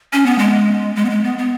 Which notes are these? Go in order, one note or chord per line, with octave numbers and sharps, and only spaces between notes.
C#4
B3
G#3
G#3
B3
G#3
B3
B3